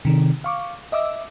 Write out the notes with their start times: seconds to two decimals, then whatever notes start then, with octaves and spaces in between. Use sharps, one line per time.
0.05 C3 D#3
0.44 F5 C#6 D6
0.92 D#5 E5 D6 E6